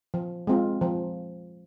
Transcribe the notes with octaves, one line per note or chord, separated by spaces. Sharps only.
F3
G#3 C4 F4
F3